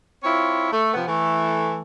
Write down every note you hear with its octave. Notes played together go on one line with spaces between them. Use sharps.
C4 E4 F4 C#5
A3
C3 F3 B3
E3 A3